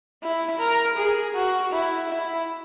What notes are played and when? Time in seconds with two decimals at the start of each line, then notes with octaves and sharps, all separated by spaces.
0.23 E4
0.59 A#4
0.97 G#4
1.35 F#4
1.72 E4
2.10 E4